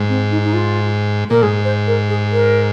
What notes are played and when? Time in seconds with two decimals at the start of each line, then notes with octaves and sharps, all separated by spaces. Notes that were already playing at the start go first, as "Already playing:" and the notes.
Already playing: G#2
0.09 C4
0.31 D#4
0.44 D#4
0.54 F4
1.30 A#2 A#4
1.42 G#2 G#4
1.64 C5
1.87 A#4
2.09 G#4
2.31 A#4